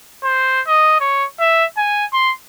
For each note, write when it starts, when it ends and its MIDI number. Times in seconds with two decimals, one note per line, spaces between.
0.24 0.61 72
0.67 0.96 75
1.00 1.25 73
1.40 1.65 76
1.77 2.05 80
2.13 2.34 84